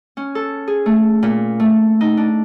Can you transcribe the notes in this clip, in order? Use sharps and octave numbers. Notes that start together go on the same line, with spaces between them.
C#4
A4
G#4
A3
A#2
A3
D#4
D4